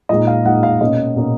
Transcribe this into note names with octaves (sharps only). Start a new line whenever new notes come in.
A#2 G#3 D#4 D#5
F5
A#2 G#3 D#4 F#5
F5
B2 A#3 C#4 D#5
B2 A#3 C#4